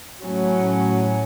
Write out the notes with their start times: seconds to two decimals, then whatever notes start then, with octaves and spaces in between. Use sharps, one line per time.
0.23 A2 F#3 C#4